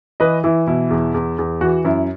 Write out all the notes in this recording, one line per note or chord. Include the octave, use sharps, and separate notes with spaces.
E3 B4 D#5
E3 E4
B2 E4
E2
E2
E2
E3 F#4
F#2 E4